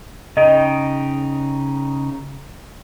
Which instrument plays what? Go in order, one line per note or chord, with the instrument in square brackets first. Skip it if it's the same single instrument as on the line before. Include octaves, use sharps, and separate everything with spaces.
[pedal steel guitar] C#3 D#4 G5 [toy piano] D#5